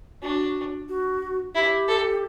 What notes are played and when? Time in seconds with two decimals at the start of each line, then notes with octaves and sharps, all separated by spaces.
0.22 D4 F#4
0.89 F#4
1.55 E4 G4
1.88 A4